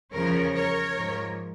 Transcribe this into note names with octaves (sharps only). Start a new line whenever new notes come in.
E2 C#3 F3 A#4 C#5
A#4 C#5
G#2 F3